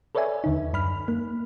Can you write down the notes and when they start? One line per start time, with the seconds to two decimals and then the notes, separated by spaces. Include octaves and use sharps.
0.15 A4 B4 C#5 D5 E5 G#5
0.44 D#2 D3 D#4
0.73 F#2 B5 F6
1.08 A#3